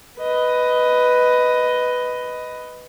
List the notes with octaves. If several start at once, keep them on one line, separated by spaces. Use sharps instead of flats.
B4 D#5